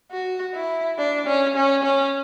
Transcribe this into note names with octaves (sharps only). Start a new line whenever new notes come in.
F#4
E4
D4
C#4
C#4
C#4